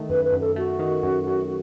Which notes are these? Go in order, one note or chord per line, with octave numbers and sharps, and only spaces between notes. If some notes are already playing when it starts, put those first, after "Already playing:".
Already playing: D#3 A3
F#2 B4
B4
F#2
A4
A3 F#4
D#3
F#2
F#2